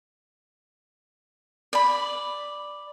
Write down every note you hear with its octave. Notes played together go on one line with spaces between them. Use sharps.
D5 B5